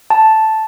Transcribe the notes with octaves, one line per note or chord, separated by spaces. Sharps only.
A5